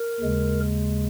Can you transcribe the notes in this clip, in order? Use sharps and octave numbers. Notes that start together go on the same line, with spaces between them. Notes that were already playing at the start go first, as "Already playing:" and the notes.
Already playing: A#4
D#2 C#3 G#3